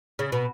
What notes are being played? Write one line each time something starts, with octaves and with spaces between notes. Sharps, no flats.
C#3
B2